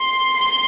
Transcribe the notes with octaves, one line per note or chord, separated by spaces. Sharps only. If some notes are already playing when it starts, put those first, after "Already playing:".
Already playing: C6
C6